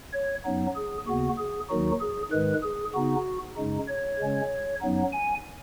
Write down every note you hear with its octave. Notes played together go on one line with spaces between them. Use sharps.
C#5
F#2 F#3 B3 D#4
G#4
D#2 C#3 B3 F#4
G#4
D#2 D#3 F#3 D#4 F#4
G#4
G#2 D#3 G#3 B4
G#4
C#3 B3 D#4 F#4
F#2 C#3 G#3 D#4
C#5
C#3 G#3 C#4
F#2 F#3 B3 D#4
G#5